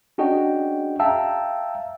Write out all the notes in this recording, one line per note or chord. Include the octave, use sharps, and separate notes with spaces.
C#4 D4 F#4 G#4 D#5 G5
E5 F5 G5 A5 A#5 E6